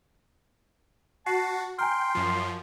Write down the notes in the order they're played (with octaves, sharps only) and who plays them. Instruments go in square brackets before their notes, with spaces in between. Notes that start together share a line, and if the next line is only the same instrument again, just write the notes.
[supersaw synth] F#4 [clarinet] A5 [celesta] C7
[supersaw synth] G5 [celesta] G#5 A#5 F6 [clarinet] C6
[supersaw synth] F#2 F3